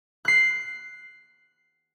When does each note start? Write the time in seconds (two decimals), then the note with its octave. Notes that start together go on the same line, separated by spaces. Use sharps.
0.25 F#6 C7